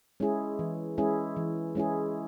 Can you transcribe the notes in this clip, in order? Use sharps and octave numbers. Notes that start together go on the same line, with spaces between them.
G#3 C#4 E4 G#4
E3
G#3 C#4 E4 G#4
E3
G#3 C#4 E4 G#4